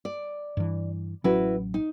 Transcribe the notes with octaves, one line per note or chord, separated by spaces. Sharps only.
D5
G2 E3
A1 F#3 C#4 E4 F#4 B4
D#4